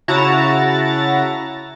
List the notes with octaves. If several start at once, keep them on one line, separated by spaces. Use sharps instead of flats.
C#3 E4 F#4 A5 A#5 A6